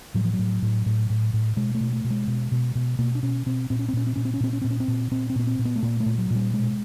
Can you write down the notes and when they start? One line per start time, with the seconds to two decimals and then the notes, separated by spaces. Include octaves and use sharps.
0.14 A2 F#3
0.25 F3
0.34 F#3
0.39 A2
0.62 A2
0.86 A2
1.10 A2
1.33 A2
1.56 B2 G#3
1.75 A3
1.81 B2
1.93 A3
2.04 B2
2.10 G#3
2.27 B2
2.52 B2
2.75 B2
2.99 B2 A#3
3.15 D4
3.23 B2 C#4
3.46 B2 C4
3.70 A#2 C4
3.79 C#4
3.88 C4
3.93 A#2 C#4
4.07 C4
4.16 A#2 C#4
4.25 C4
4.34 C#4
4.40 A#2 C4
4.53 C#4
4.62 A#2 C4
4.71 C#4
4.80 C4
4.88 A#2
5.11 A#2 C4
5.30 C4
5.36 A#2 B3
5.47 C4
5.59 A#2
5.65 B3
5.76 A3
5.82 A#2 A#3
6.00 A3
6.06 A#2
6.18 F#3
6.30 A#2
6.35 G3
6.53 B2 G#3